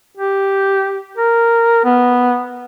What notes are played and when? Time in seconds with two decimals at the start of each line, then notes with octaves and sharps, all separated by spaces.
0.17 G4
1.18 A#4
1.84 B3